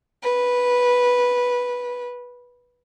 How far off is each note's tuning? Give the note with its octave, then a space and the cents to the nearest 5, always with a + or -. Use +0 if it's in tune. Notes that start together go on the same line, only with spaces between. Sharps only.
B4 -10